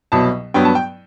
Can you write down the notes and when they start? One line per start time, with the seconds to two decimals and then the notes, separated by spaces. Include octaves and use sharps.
0.12 C2 B2 F#3 A5
0.54 G2 F#3 B3 G5
0.65 A5
0.75 G5